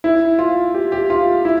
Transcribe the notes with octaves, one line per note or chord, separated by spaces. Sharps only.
E4
F4
G4
G4
F4
E4